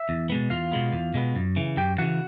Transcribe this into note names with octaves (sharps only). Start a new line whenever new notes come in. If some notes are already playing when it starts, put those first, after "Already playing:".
Already playing: E5
E2
B2 G#3 B3
E2 F4 F5
B2 G#3 B3
E2
B2 G#3 B3
F#2
C#3 E3
F#2 G4 G5
C#3 E3 F#4 F#5